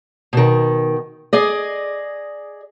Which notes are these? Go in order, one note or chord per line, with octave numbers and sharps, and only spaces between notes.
B2 D#3
G#4 D5 D#5